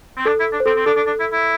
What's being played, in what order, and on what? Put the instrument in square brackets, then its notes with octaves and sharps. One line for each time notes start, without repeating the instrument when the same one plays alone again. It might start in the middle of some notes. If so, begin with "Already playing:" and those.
[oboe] C4
[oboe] D4 [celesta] A4
[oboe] E4
D4
[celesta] C5
[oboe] C4 [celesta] A4
[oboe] C4
[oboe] D4 [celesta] A4
[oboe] D4
D4
E4
E4